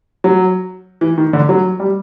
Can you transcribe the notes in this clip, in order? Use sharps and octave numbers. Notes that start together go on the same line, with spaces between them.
F#3
E3
D#3
D3
F#3
G3